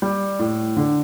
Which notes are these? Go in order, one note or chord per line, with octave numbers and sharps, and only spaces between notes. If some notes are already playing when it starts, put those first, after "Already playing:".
G3
A2
D3